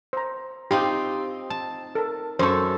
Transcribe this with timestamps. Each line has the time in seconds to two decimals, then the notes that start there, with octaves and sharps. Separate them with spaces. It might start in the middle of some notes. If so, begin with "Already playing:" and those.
0.13 C5 A#5
0.71 C4 D#4 F4 G4
1.50 A5
1.95 A4 A#4
2.39 F#2 A4 C5 C#6